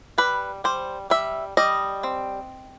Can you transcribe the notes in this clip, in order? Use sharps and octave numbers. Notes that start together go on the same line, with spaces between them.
G3 B4
G3 C5
G3 E5
G3 D#5
C4